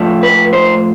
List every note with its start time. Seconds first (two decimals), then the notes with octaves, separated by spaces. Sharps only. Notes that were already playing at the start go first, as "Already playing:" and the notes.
Already playing: A2 F3 A3
0.23 B4
0.53 C5